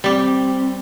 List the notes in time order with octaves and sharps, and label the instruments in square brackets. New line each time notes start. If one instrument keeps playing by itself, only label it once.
[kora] G3 G4 [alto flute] C4